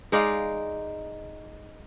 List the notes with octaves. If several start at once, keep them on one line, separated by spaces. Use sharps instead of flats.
G#3 D#4 D5 F5